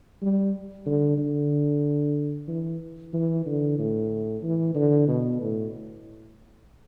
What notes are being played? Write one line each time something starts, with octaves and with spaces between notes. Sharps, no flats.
G3
D3
D3
E3
E3
D3
A2
E3
D3
B2
A2